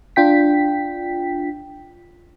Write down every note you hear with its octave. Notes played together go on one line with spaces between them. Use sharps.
D4 F4 G5 B6